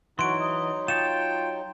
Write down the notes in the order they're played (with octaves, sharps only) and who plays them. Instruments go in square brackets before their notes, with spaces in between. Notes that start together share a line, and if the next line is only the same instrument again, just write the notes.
[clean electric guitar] E3 [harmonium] F#3 D#4 [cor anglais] F#4 [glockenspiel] C6 D7
[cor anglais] D#5
[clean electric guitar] F4 C#5 A5 [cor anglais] G5 [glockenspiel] E7